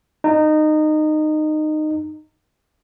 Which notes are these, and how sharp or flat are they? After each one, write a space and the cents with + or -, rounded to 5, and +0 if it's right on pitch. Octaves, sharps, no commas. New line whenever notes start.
D#4 -20